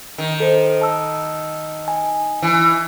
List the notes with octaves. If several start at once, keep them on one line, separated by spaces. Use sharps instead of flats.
D#3
A4 C5
A5 E6
G#5
E3